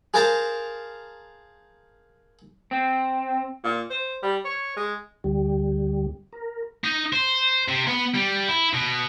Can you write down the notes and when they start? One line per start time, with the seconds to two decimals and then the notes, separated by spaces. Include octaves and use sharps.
0.14 G#4 A#4 C5 F5 A5 A#5
2.71 C4
3.64 A#2
3.90 C5
4.23 G3
4.45 C#5
4.76 G#3
5.24 D2 G3
6.33 A#4
6.84 D#4
7.13 C5
7.68 C3
7.87 B3
8.14 G3
8.48 E4
8.73 B2